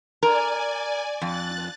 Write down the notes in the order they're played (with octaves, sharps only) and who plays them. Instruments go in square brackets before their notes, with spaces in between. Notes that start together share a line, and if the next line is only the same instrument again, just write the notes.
[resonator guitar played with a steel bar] A#4 [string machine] D5 G#5
[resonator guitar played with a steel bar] F2 [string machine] F#6 A6